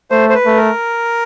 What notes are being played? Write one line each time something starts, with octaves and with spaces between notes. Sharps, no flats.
A3 C5
C5
B4
A3
A#4